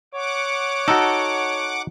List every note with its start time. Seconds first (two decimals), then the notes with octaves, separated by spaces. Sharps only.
0.14 C#5 F#5 D6
0.88 D#4 F#4 A4